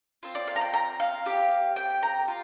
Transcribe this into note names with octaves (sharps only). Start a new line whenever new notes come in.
C4 F4
D5
F5
A#5
G5
A#5
F5
C4 G4
G5
A#5
F4